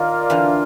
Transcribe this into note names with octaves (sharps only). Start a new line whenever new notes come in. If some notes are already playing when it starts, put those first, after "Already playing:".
Already playing: D#3 F4 A#4 D5 F5
D3 E3